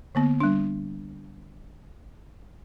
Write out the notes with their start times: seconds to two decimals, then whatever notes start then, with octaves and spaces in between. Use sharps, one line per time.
0.15 D3 A#3 B3
0.40 G3 D4